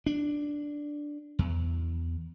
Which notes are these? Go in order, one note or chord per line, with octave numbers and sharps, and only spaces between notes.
D4
E2